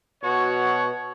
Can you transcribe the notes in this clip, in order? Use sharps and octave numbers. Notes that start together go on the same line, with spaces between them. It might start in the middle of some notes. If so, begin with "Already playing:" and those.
B2 F#4 C#5